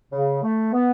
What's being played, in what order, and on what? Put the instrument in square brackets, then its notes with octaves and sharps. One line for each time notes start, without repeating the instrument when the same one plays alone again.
[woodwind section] C#3
A3
B3